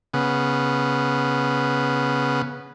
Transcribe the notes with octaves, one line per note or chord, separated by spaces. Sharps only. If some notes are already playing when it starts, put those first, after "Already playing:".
C#3 B3